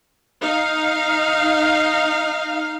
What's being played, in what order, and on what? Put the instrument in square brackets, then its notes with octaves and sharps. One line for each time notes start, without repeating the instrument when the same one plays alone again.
[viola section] D#4 F5